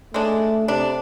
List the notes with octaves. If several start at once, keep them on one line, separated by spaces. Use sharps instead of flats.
G#3 A3 D4
C3 D4